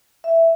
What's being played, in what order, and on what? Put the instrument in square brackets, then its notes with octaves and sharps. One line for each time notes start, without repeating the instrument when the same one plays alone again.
[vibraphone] E5